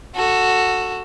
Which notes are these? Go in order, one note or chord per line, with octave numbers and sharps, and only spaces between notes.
F#4 A4